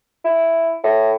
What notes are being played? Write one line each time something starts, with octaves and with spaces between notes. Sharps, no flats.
E4
A2